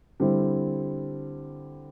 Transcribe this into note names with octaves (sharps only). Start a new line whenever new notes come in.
D3 G3 C4 E4